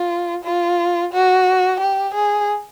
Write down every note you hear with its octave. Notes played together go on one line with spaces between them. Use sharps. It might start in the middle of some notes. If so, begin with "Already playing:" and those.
Already playing: F4
F4
F#4
G4
G#4